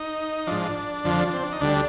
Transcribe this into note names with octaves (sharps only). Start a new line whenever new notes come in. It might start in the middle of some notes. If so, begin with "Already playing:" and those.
Already playing: D#4
G#2 F3 D4
F2 D3 F3
C4
D4
D#4
D2 D3 G3 D4